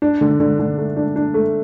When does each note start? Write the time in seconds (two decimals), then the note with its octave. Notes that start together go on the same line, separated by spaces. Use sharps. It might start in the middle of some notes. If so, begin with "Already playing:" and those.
0.02 D4
0.21 D3
0.40 D3
0.59 D3
0.78 A3
0.97 D4
1.16 D4
1.34 A3